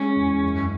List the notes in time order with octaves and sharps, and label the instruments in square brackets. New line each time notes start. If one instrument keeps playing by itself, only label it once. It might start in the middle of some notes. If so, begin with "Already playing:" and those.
Already playing: [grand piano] G#3 [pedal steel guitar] C#4
[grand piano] E2
F#2